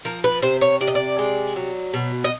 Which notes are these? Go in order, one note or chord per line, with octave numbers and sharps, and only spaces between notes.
F3 A#4
B4
C3 C5
C#5
C3 D5
D#5
D5
G#3
F#3
B2
D#5